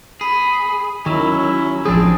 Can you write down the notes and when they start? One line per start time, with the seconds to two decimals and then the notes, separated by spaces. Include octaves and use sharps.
0.21 G#4 B5
1.06 D#3 F#3 C#4 E4
1.85 A1 F3 C4 D4 G#4 D#6